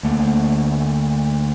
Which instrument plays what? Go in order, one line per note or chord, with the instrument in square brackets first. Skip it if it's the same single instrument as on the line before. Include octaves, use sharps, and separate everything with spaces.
[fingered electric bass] D2 A3 A#3